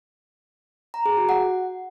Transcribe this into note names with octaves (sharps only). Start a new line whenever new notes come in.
A#5
G#4
F#4
F#5